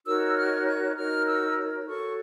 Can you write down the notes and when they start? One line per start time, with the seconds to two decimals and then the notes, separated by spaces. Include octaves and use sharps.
0.05 D#4 F#4 A#4 C#5 E6
0.36 F6
0.66 F#6
0.95 D#4 F#4 A#4 C#5 F6
1.26 E6
1.85 F#4 A4 C#5 C#6